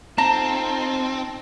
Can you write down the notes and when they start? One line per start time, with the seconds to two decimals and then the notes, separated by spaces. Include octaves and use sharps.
0.18 C4 D#4 F4 A4 A5 A#5